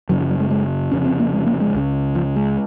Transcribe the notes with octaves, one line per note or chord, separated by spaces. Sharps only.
F#1 F#2 C#3 F#3
F3
F#3
G#3
G#3
F1 F2 C#3 C#4
C4
A#3
G#3
A#3
G#3
C#2 C#3
F3
G#3